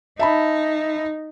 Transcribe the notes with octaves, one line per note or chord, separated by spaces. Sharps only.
D#4 E5 A5 B5